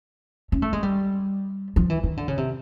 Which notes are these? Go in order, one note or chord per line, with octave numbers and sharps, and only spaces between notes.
C#4
A3
G#3
G3
F3
E3
D#3
D3
C#3
C3